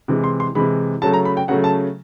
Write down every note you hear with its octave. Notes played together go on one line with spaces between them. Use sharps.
C3 E3 G#3
C6
C6
C3 E3 G#3 B5
C#3 F#3 A3 A5
A#5
B5
G5
C#3 F#3 A3 F#5
A5